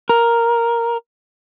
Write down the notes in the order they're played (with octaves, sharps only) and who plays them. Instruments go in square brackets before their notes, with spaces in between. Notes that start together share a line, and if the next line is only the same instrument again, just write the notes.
[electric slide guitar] A#4